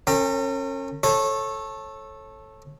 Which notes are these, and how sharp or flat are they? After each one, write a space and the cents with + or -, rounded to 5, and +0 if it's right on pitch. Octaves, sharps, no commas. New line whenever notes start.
C#4 -30 A#4 -45 G5 +25
A4 +0 C#5 -25